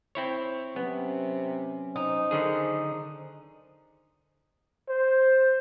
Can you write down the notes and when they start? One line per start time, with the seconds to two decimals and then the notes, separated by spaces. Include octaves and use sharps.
0.15 C4 E4 C#5
0.76 C3 F#3 B3 C#4
1.96 D#4 C5
2.31 D3 D#3 G#4
4.88 C5